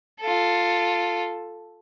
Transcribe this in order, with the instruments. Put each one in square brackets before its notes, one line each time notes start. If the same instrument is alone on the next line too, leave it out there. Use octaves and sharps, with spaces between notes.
[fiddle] F4 A4